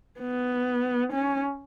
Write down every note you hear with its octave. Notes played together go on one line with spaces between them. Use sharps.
B3
C#4